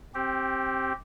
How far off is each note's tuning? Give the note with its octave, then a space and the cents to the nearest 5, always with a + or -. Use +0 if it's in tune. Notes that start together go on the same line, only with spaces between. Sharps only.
C4 +15 G4 -10